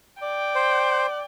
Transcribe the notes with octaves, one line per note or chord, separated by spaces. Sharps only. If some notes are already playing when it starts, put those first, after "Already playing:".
D5 G5
C5